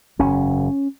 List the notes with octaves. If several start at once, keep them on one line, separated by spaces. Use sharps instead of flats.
F#1 E2 C#3 C#4